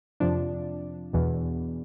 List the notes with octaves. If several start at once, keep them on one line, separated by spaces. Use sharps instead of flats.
F2 C3 F3 D4
E2 B2